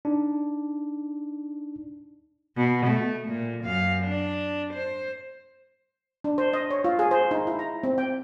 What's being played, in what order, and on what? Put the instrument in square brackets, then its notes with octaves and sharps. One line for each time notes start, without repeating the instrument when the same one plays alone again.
[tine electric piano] D4 D#4
[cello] B2
A3
A#2
F#2 F5
D4
C5
[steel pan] D4
C5
D#5
C#5
F4
G#4
C5
D#4
E4
A#5
C4
G5